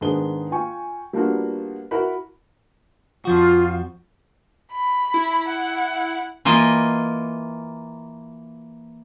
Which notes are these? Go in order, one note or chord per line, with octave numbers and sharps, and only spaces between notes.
G#2 D#3 B3 D4 G#4 G7
F4 G5 G#5 C#6
G3 A#3 B3 D4 F4 F#4
E4 F#4 A#4 B5
F2 F3 F4 F#4
B5
E4
F#5
E3 A#3 F4 D#5